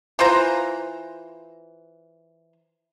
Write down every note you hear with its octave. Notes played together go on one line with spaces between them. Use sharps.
E3 F4 C5 A#5